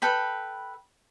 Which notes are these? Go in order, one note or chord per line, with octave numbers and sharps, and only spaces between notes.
A4 B4 G5 B5